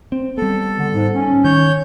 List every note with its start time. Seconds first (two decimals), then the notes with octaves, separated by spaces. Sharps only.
0.12 C4
0.38 G3 B3 A4
0.79 D3
0.93 G#2
1.13 C#4
1.44 D#3 C#5 G6